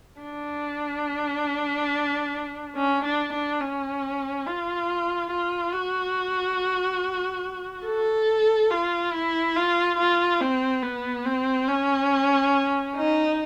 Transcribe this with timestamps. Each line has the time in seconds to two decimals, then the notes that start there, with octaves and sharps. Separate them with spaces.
0.21 D4
2.76 C#4
3.04 D4
3.33 D4
3.61 C#4
4.46 F4
5.31 F4
5.73 F#4
7.86 A4
8.70 F4
9.13 E4
9.56 F4
9.98 F4
10.41 C4
10.83 B3
11.26 C4
11.68 C#4
12.96 D#4